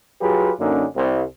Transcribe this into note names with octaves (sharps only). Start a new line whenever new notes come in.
F#3 F4 G4 G#4 B4
F#2 D3 A#3 C#4 D#4
C2 C4